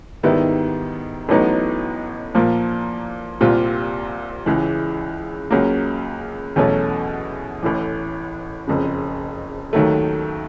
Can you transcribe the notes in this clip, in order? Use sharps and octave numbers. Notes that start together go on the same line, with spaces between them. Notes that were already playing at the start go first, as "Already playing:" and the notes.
G#2 D#3 G3 B3 E4
A1 A2 F#3 B3 D#4
A#2 F3 A#3
C2 A#2 G3 C4 F4
C#2 C#3 E3 G#3
C#2 C#3 F#3 A#3
E2 B2 F#3 A3 C#4
A1 A2 E3
F#1 F2 C#3
D#2 D#3 F#3 A3